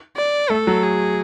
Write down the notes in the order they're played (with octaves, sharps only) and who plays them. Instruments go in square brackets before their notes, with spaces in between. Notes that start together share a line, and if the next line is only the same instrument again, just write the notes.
[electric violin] D5
[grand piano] A3 [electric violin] A4
[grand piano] F#3
[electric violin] G#4